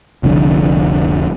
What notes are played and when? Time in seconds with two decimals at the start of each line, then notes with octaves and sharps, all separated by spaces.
0.23 F1 C2 F2 D3